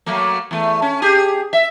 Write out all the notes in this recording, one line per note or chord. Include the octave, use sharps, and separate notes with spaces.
F#3 A3 A#3
E2 A3
C#4
G4 G#4
E5